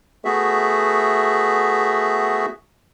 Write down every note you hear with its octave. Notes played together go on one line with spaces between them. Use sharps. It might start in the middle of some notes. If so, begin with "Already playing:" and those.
A3 B3 F#4 G#4 E5